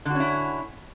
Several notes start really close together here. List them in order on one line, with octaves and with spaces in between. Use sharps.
D3 F#4 C#4 E4